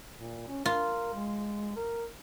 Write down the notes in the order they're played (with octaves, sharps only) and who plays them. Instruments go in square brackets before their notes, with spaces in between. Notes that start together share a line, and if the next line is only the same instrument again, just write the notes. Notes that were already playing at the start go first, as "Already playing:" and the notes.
[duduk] A#2
C#4
[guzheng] F4 [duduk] A#4
[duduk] G#3
A#4